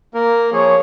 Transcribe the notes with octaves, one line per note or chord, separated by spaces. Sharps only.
A#3 A#4
F3 G#4 C#5